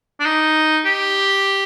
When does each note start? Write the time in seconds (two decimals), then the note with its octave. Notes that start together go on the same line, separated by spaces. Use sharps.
0.20 D4
0.25 D#4
0.85 G4